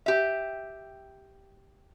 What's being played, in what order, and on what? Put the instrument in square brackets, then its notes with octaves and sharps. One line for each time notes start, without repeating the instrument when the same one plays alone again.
[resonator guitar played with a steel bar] G4 E5